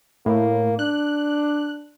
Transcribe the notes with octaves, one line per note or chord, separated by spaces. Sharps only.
A2 A#3
D4 F#6